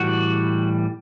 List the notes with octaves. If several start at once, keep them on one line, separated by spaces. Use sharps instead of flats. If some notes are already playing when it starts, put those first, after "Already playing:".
Already playing: A2 E3 G3 F#4